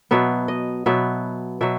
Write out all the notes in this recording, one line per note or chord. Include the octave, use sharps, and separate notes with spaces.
B2 F#3 B3 E5
D#5
B2 F#3 B3 E5
B2 F#3 E5